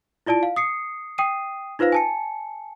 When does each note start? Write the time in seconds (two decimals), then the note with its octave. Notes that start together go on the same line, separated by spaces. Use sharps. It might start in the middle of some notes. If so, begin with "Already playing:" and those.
0.26 E4 F4 D5 A5 D7
0.43 F5
0.56 D#6 C7 C#7
1.18 G5 D#6 C7 D#7
1.79 D#4 F4 B4 C5 F5 A#6
1.92 G#5 A5 C#7